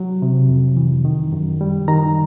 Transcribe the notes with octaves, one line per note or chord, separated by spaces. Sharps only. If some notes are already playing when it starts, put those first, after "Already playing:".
Already playing: F#3
C3
F2
E3
D#3
F#2
G3
D#3 A#5